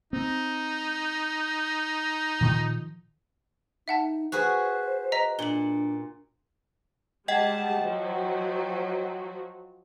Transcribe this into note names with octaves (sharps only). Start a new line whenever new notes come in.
C4 D#4
A#2 D#3 F3
D#4 E5 F#5 A5
F#4 G#4 B4 C5
D#5 A#5 B6
A#2 D4 F#7 G7
G3 G#3 D#5 F#5 G5 A5
F3 F#3 F#4